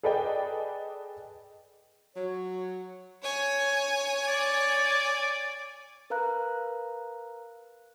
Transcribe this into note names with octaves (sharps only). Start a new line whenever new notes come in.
G#4 A4 B4 D5 D#5 G5
F#3 C#5
C#5 G#5
D5
A#4 B4 F5 A#5 F#6